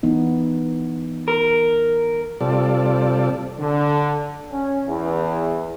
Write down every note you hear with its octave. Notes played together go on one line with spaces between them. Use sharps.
E3 B3 D#4
A#4
C3 G3 F4 A4 D5
D3
C#4
E2